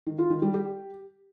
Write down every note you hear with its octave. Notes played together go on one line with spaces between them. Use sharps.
D#3
F4
D#3
G3
G4